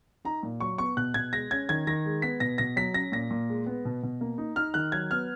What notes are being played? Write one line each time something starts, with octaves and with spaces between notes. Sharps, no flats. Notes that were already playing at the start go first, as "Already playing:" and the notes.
D#4 A#5
A#2
F#3 C#6
B3 C#6
B2 F#6
B2 G#6
G#3 A#6
C#4 G#6
D#3 G#6
D#3 A#6
G#3
B3 B6
B2 A#6
B2 A#6
F#3 B6
C#4 A#6
A#2 A#6
A#2
G#3
B3
B2
B2
A#3
D#4
D#4 F6
D#3 F#6
F#3 G#6
B3 F6